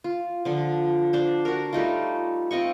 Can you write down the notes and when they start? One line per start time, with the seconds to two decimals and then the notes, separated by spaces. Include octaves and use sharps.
0.04 F4
0.45 D3 F3
1.13 D4 C5
1.45 F#4 A#4
1.73 G3 A3 D#4 F4
2.51 C4 F4 D#5 C#6